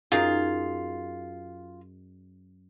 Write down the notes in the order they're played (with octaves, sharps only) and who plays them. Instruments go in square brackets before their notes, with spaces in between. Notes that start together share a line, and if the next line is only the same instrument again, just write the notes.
[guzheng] F#2 D#4 G#4 [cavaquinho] F4